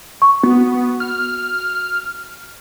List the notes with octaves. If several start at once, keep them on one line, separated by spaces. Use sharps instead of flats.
C#6
B3 F#4
F6